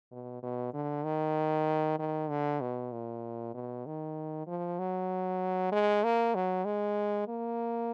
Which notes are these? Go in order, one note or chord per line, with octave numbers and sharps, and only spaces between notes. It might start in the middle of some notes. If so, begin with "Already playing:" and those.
B2
B2
D3
D#3
D#3
D3
B2
A#2
B2
D#3
F3
F#3
G#3
A#3
F#3
G#3
A#3